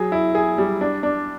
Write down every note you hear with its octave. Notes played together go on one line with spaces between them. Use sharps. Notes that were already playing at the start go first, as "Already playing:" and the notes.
Already playing: F#3 G#4
E4
G#4
G3
D4
D4